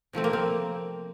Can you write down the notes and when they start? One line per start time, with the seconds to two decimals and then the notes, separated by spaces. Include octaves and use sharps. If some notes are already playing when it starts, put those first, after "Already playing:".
0.13 C3 F3 A3 C4
0.24 A#3
0.33 C4